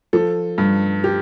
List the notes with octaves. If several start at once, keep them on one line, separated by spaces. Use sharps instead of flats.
F3 A4
G2
G4